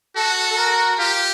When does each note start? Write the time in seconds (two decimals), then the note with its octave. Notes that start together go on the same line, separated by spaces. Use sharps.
0.16 F#4 A4
0.51 A4
0.58 A#4
0.99 F4 G4